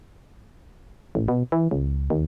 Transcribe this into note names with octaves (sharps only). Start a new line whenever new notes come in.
A1
B2
E3
C#2
D#2